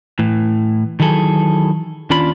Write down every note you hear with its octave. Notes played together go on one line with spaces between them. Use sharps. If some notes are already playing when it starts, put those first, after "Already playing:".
A2 E3
D#3 E3 F#3 G#4 A4
D#2 C#4 D4 F4 B5